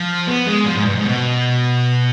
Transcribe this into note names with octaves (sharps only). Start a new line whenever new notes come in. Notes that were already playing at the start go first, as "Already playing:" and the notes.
Already playing: F3
B3
G#3
F3
G#2
G2
G#2
B2